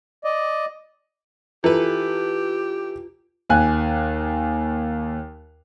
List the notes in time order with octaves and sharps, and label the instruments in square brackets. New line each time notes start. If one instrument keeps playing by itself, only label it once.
[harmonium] D5 D#5
[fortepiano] E3 A4 B4 [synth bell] F4 [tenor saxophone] G4
[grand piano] D#2 G#5 F#6